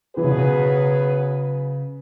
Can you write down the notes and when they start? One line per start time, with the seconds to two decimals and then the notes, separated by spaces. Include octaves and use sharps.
0.16 E3 F#3 B3 G#4 B4
0.24 C#3
0.31 B2
0.38 C#3